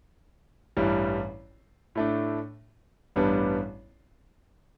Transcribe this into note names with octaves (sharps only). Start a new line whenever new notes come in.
A1 G2 E3 G3
A2 A3 D4
A1 G2 G3 B3 D4